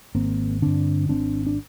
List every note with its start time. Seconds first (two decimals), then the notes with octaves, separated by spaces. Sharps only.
0.15 G#1 A#3 C4
0.62 G2 D3 C4 D4
1.09 G#1 C4 D4
1.46 D4